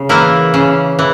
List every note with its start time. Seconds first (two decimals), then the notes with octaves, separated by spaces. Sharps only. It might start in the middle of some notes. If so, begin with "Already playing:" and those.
Already playing: C#3
0.09 E3 A#3 E4
0.54 C#3
0.99 E3